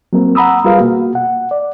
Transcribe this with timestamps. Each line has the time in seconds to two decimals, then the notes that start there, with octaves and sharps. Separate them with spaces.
0.13 F#3 A#3 C4 A#4
0.35 F#5 A#5 B5 D#6 E6
0.64 G3 F4 G#4 A#4 B4 F5
0.78 B2 A#3 F#4
1.15 F#5
1.51 D5